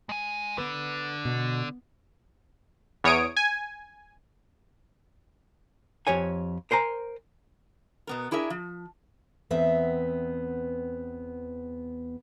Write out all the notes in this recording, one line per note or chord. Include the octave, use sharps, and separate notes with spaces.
G#3 G#5
D3 B3 B4
B2
E2 C#5 D#6 D7
G#5
F2 G4 C#5 G#5
A#4 C5 G#5 A#5
B2 B3 A#4
D4 E4 G#4 A#4 E5
F3
E2 B3 C4 E5